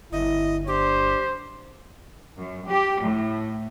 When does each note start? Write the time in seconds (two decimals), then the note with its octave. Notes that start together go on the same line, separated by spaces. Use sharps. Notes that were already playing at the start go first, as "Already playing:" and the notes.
0.12 G1 E4 D#5
0.67 D4 G4 C5
2.37 F#2
2.69 G4
3.02 A2